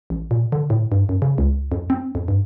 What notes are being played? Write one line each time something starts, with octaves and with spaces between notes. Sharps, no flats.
A1
A#2
D3
A2
G2
F#2
C#3
C#2
F2
C4
F2
G2